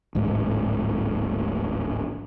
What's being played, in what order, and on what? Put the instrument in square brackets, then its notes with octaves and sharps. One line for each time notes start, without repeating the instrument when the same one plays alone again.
[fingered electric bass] D1 A1 G#2